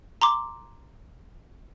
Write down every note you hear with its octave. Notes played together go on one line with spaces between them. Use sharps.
A#5 C6 D6